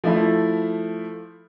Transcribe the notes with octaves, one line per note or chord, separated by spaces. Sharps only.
F3 A3 E4